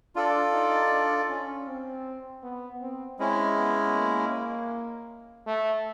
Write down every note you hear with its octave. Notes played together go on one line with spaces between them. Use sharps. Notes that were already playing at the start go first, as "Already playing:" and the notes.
D4 F4 A4 D5
D#4
D4
C#4
C4
B3
C4
G#3 C4 C#4 E4
B3
A#3
A3